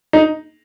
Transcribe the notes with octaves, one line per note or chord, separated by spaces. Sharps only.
D#4